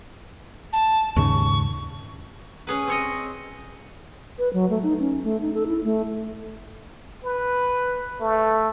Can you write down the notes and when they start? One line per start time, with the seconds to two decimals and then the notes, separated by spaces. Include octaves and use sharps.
0.73 A5
1.16 D#2 G#2 C#3 C#6
2.67 C#4 G#4 B4
2.87 C4 C#5 D#5
4.39 B4
4.53 F#3
4.70 A3
4.83 D#4
5.00 C#4
5.24 A3
5.41 D#4
5.54 A4
5.67 E4
5.84 A3
7.24 B4
8.21 A3